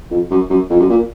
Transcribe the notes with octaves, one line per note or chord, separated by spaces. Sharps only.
F2
F#2
F#2
F2
F#2
A#2